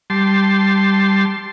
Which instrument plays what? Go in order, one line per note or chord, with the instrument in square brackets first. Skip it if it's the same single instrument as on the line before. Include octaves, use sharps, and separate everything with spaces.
[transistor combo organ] G3 A5 C6